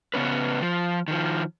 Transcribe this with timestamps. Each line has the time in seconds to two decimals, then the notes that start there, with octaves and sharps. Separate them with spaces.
0.14 C#3 B3 C#4 B4
0.62 F3
1.08 D#3 F3